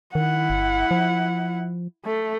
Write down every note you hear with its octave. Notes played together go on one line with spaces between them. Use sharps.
D#3 E4 F#5
G1
F3
A3